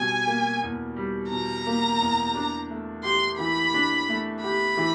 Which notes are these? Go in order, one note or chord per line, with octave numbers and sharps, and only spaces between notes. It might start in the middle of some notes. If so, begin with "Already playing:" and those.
Already playing: B2 G3 G#5
A#3
E2
G3
B2 A#5
A#3
E2
D4
A3
G4 C6
E3 B5
D4
A3
G4 B5
E3